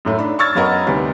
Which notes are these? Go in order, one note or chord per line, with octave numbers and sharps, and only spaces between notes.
F#2 A2 A3
D4 D#4 B5
C#6 E6 F6 G#6 A6
F#2 B3 A#4 D#5 F#5 B5
D2 C3 G3 D#4 B4